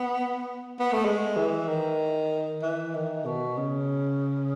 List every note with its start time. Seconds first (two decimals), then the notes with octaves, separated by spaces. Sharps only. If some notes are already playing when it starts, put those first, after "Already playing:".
Already playing: B3
0.79 B3
0.92 A3
1.05 G#3
1.36 E3
1.68 D#3
2.63 E3
2.94 D#3
3.25 B2
3.57 C#3